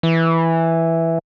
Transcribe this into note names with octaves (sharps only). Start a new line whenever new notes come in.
E3